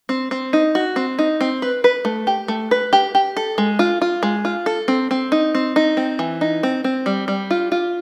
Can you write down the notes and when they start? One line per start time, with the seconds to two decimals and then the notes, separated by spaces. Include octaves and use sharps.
0.09 C4
0.31 C4
0.53 D#4
0.75 F#4
0.96 C4
1.19 D#4
1.41 C4
1.62 B4
1.84 B4
2.05 A3
2.27 G4
2.48 A3
2.71 B4
2.93 G4
3.15 G4
3.37 A4
3.58 G#3
3.79 F4
4.01 F4
4.23 G#3
4.45 F4
4.66 A4
4.88 C4
5.11 C4
5.32 D#4
5.55 C4
5.76 D#4
5.97 C4
6.19 E3
6.41 D#4
6.63 C4
6.84 C4
7.06 G3
7.28 G3
7.51 F4
7.72 F4